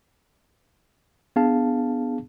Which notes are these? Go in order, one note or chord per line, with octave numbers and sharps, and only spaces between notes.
B3 D4 G#4 F5 A5